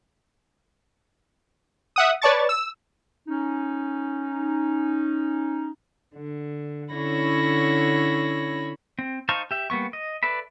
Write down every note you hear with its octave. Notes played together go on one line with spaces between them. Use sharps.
E5 F#5 D#6
B4 C#5 D5 A5 C#6 A6
E6
C#4 D#4
D3
D3 C#4 E4 C#5 B5 A#6
C4
D#4 C5 F5 A5 C#6
G4 E5
G3 A#3 B3 C#6
D#5
A4 B4 D5 E5 B5